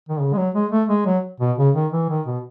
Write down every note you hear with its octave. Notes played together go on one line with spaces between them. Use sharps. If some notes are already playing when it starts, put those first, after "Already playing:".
D#3
C#3
G#3
F#3
G#3
A3
G#3
F#3
B2
C#3
D#3
E3
D#3
B2